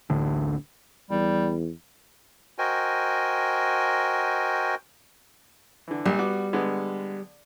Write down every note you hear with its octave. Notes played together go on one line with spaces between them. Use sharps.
A1 D2 A2 D3
E2 G3
F#4 A#4 C5 D#5 G5 G#5
D3 E3
A#1 G3
B3 F#4 D6
D3 G#3 B3